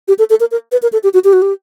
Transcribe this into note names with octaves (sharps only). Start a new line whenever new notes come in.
G4
A4
A4
A#4
A#4
B4
A#4
A4
G4
F#4
G4
F#4
G4